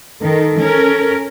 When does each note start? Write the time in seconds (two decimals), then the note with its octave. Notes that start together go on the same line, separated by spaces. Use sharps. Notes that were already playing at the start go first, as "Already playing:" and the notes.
0.22 D#3 A4
0.58 C#4 A#4